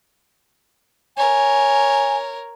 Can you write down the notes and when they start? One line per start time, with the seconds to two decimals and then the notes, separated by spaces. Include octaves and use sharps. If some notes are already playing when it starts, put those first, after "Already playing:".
1.17 A#4 C#5 G#5